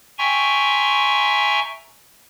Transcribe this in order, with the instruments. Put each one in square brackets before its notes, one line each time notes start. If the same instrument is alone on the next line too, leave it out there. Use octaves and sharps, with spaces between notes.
[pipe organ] E5 G5 G#5 A#5 C6 C#6